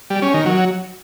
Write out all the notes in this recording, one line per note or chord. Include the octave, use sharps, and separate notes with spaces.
G3
C#4
D#3
F#3